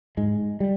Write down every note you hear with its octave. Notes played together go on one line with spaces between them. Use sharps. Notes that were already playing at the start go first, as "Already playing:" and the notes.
G#2 G#3
G3